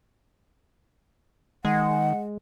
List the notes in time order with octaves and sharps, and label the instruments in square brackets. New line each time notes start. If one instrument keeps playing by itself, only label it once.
[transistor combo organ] D#3 [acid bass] G#3 [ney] F#5